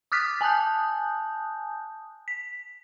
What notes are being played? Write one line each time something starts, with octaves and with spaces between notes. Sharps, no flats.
D6 D#6 F6 F#6 A6 B6
G#5 A5 D#6 F#6 G6
B6